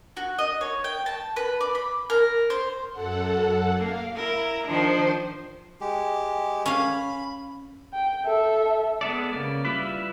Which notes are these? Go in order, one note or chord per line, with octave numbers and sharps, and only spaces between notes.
F#4
D#5
C#5
G5
A5
B4
D5
B5
A#4
C5
F#2 A4 F#5
A#3 F5
E4 A#4 A#5
D#3 F3 D4 C5 C6
G#3 G4
C#4 F5 B5
G5
A4 E5
G#3 B3 A4 D5
C#3 A#3 D5
G3 E4 F4 B4 B5